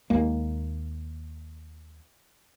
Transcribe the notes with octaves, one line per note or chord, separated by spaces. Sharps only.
D#2 G#3 A#3